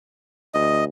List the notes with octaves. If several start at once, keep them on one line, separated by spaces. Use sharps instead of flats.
D2 D#5